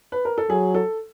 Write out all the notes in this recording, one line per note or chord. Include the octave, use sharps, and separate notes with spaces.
B4
A#4
A4
F#3 G#4
A4